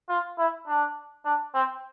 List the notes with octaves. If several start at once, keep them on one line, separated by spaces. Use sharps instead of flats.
F4
E4
D4
D4
C4